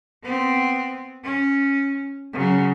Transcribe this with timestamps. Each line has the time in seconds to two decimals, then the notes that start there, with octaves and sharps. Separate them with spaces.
0.24 B3 C4
1.24 C#4
2.33 C#3 F#3